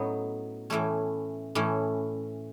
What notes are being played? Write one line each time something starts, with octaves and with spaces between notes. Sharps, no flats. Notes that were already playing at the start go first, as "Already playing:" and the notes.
Already playing: A2 F#3 B3 C#4 D#4
A2 E3 A3 C#4
A2 E3 A3 C#4